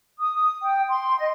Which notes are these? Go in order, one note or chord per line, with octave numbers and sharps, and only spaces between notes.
D#6
G5
C6
D#5